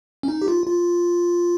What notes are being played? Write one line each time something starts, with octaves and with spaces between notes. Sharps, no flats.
C#4
D#4
G4
F4
F4